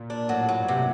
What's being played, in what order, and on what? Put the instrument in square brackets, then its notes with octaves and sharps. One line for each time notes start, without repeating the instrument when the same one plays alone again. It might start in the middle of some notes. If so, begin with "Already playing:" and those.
Already playing: [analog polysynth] A#2
[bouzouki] D4
[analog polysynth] A2 [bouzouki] F#3
[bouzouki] F#3
[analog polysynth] G2
[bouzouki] C3